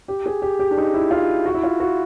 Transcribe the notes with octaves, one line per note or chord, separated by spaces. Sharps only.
G4
G#4
G4
G4
D4
D#4
E4
F4
F#4
E4
F4
F#4